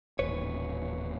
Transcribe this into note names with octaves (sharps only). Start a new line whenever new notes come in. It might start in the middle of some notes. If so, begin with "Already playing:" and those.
D#1 A1 B4 C#5